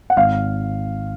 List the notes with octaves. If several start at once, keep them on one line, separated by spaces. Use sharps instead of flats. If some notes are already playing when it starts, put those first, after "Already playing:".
F#5
G#1 F5